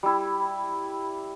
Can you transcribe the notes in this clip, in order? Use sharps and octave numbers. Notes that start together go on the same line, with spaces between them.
G3 E4